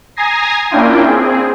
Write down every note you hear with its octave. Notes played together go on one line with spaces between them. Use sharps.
G#5 A#5 D#6 G#6 A#6 C7
A#3 C#4 D4 E4 F4 G5
C4 G#4